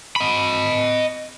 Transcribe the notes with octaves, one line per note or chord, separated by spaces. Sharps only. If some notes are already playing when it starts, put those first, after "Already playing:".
D#5 B5